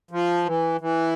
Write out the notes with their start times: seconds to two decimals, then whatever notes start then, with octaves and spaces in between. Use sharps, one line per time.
0.11 F3
0.46 E3
0.81 E3